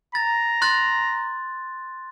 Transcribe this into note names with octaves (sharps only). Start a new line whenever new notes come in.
A#5 A6
C6 F#6 A6